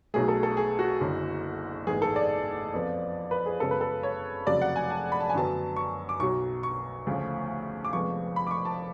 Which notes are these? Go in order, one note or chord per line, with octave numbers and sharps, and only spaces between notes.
B1 B2 F#3 A3 G#4
A4
A4
G#4
F#4
F#1 F#2 D3
A1 G#2 G#3 B3 G#4
A4
D5
F2 F3 B3
B4
G#4
F#2 C#3 G#3 B3 A4
B4
A4
C#5
F1 F2 C#3 F#3 D5
F#5
G#5
A5
B5
A5
G#5
F#2 D3 F#3 B3 A5
C#6
D6
B1 B2 F#3 C#6
C#6
D2 C#3 F3 A3
D6
F1 F2 F3 G#3 B3 C#6
B5
D6
C#6
A5